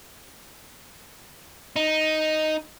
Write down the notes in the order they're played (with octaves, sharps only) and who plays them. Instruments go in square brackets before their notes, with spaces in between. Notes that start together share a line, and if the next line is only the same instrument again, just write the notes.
[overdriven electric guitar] D#4